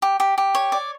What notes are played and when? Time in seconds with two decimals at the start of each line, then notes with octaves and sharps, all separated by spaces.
0.02 G4
0.20 G4
0.38 G4
0.55 C#5
0.72 D5